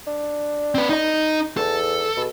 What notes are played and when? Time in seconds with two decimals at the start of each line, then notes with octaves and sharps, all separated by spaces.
0.07 D4
0.75 C4 B4
0.89 D#4 D#5
1.57 E2 A4
2.17 B2